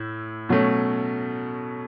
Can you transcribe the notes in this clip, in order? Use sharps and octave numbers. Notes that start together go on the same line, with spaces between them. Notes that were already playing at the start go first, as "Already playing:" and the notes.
Already playing: A2 E4
B2 F#3 A3 C#4